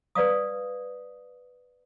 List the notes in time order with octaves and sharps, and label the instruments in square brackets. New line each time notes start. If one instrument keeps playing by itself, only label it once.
[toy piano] B4 D5 F5 D#6